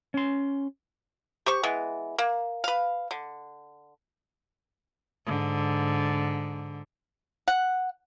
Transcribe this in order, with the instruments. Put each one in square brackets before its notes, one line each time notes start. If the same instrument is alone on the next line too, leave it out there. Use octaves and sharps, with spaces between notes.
[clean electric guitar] C#4 C6
[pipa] G4 C5 C#6
E3 G#3 B3
A#3
B4 F5
D3
[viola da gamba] G#2 D3
[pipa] F#5